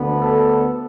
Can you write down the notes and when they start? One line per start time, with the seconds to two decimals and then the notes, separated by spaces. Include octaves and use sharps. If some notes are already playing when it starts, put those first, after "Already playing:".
Already playing: D2 D3 B3
0.18 A4